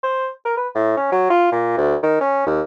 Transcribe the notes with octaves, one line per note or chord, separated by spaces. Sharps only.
C5
A#4
B4
A2
C#4
F#3
F4
A#2
D2
D#3
C#4
D#2